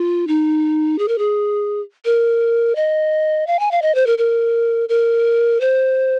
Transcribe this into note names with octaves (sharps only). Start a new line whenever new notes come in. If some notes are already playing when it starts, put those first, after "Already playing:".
Already playing: F4
D#4
G#4
A#4
G#4
A#4
D#5
F5
G#5
F5
D#5
C5
A#4
A#4
A#4
C5